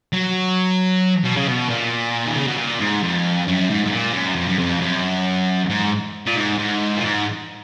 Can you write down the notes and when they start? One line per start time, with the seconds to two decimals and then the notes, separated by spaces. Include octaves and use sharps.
0.13 F#3
1.24 B2
1.37 C#3
1.48 B2
1.69 A#2
2.26 D#3
2.36 C#3
2.47 B2
2.58 A#2
2.80 G#2
3.03 F2
3.47 F#2
3.70 G#2
3.85 G#2
3.92 A#2
4.13 F#2
4.36 F2
4.48 F#2
4.59 F2
4.81 F#2
5.70 G#2
6.26 A#2
6.36 G#2
6.58 G#2
6.96 A#2
7.04 G#2